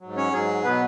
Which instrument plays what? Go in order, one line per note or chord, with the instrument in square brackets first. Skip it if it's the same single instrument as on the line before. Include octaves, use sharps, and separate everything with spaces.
[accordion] G#2 F#3
C#4 C#5
G#2 F#3 G#4
B2 F#3 B3 B4